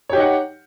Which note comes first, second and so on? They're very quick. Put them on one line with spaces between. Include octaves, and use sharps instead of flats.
C#5 G4 D#4 F#5